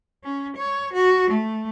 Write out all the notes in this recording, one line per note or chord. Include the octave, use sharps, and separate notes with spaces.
C#4
C#5
F#4
A3